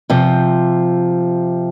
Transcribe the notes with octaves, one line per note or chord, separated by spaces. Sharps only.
C3 F3